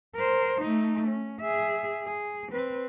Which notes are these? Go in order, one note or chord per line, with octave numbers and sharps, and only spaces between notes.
A#4 C5
A3 D#4
C#4
G#4 E5
G#4
C4 B4